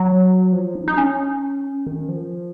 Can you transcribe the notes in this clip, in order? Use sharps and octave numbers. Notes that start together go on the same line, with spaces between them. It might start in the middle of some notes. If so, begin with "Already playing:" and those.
Already playing: F#3
F3
D#4
D#4
C#4
D#3
F3